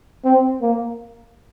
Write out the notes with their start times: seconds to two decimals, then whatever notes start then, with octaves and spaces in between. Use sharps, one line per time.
0.25 C4
0.62 A#3